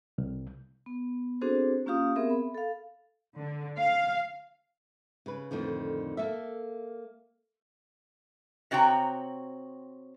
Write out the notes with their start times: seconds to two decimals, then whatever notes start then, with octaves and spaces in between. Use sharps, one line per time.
0.18 C2
0.86 B3
1.41 C4 D4 F#4 G#4 A4 C5
1.86 A#3 C#4 F4 G4 F5 D#6
2.16 B3 C4 G#4 A#4 E5
2.30 B5
2.54 A4 F5
3.37 D3
3.77 F5
5.26 C#3 B4
5.51 F2 A2 D3 D#3
6.17 A#3 A4 E5
8.71 C3 C4 F#4 C#5 G5 A#5